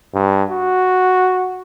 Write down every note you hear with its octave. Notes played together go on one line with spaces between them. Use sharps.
G2
F#4